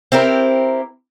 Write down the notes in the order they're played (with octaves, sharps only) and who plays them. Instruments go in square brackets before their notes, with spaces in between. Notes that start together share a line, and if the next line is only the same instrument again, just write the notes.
[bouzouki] C4 E4 G4 A#4